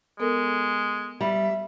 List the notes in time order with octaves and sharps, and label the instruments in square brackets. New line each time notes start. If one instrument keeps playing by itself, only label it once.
[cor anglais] G#3 [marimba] B3 A4 A#4
[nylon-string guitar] G3 [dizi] E5